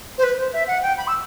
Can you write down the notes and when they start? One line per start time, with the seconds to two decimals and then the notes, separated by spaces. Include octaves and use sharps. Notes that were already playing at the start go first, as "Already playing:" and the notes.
0.18 C5
0.22 B4
0.37 C5
0.52 E5
0.67 F#5
0.82 G5
0.97 B5
1.07 E6